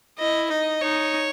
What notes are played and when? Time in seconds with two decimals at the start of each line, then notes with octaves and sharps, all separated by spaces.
0.19 E4 D#5
0.50 D#4 D#5
0.82 D#4 C#5